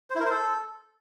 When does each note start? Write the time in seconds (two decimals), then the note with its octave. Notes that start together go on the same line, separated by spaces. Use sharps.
0.10 C5
0.15 E4
0.20 A#4
0.25 C5
0.31 A4